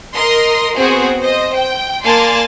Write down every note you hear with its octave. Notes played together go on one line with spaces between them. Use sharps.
A#4 D#5 C6
B3 C4 F#4 G#4 C5
C5 D#5
G5
A#3 D5 G#5 A5 C6 A6